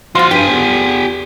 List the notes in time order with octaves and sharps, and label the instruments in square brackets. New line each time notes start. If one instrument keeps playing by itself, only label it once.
[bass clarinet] F3 [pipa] F4 C6 [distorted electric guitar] F#4 F5
[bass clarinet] G2 [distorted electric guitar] G4 G#5 [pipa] G5
[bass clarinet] E2